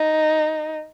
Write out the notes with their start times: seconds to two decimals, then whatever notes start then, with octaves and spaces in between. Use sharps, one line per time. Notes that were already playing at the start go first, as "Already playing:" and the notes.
Already playing: D#4